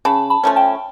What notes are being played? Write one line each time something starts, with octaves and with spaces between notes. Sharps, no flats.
C#3 A5 B5
A5 B5
F3 A3 C#4
G5 A5